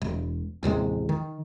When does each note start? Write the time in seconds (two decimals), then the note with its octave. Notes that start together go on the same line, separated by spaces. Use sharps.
0.02 E1
0.63 A1 D#2 C3 G#3
1.09 D#3